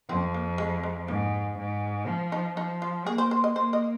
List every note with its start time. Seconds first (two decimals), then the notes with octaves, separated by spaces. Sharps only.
0.09 F2 C4
0.34 A#3
0.58 G#3
0.83 G#3
1.08 G#2 A#3
1.58 G#2
2.08 F3
2.32 D#4
2.57 F3 D#4
2.82 F4
3.06 A#3 G#4
3.18 C5
3.31 C5
3.44 D#5
3.56 A#3 C5
3.73 D#5